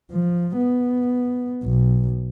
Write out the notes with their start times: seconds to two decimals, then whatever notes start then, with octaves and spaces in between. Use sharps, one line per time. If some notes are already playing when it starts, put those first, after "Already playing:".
0.11 F3
0.57 B3
1.63 B1